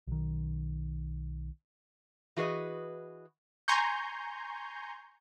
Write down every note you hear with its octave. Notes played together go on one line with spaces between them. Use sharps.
B1 D#3
E3 F#4 G#4 B4 D#5
G#5 A#5 C6 C#6 G6